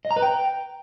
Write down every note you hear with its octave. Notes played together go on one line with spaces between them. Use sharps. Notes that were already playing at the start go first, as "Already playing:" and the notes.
D#5
A#5
B4
G5